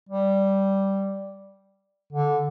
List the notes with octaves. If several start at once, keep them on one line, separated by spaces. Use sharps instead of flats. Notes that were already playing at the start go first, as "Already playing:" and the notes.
G3
D3